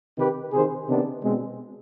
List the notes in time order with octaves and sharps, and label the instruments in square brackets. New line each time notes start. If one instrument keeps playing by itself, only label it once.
[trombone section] C3 D#3 G4 B4
C3 D#3 G#4 C5
C3 D#3 B3 D4
B2 G#3 C4